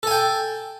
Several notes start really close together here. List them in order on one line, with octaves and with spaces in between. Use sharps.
A4 G#5 G5